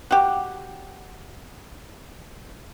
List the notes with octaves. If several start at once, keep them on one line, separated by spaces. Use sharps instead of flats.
F#4 G4